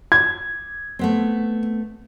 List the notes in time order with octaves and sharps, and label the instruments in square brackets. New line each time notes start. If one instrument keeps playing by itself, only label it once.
[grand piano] G#6
[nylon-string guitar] A3 B3 C4